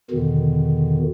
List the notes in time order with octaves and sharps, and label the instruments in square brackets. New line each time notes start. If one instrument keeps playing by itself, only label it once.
[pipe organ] E2 B2 D3 D#3